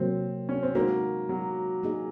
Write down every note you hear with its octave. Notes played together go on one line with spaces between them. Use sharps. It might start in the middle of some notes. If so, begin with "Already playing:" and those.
Already playing: C3 F#3 A#3 C4
C#4
C4
G#3 A#3 D#4 F#4
F#3
A#3 D#4 G#4 D#5